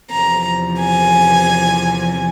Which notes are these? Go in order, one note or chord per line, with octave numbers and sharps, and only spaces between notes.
E2 C3 F3 A#5
G#5